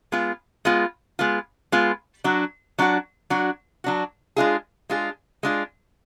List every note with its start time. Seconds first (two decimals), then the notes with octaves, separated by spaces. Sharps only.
0.12 G#3 B3 F4
0.65 G#3 B3 F4
1.19 G#3 B3 F4
1.72 G#3 B3 F4
2.24 F#3 D4 F#4
2.79 F#3 D4 F#4
3.30 F#3 D4 F#4
3.84 F#3 D4 F#4
4.36 G#3 D4 F4 G#4
4.90 G#3 D4 F4 G#4
5.43 G#3 D4 F4 G#4